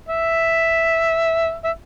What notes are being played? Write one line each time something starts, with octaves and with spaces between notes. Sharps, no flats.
E5
E5